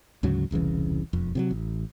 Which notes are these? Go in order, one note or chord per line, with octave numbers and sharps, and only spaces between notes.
D2 G#2 C#3 F#3
E1 C2 C#3 E3
E1 F2
C3 F3 F#3
A1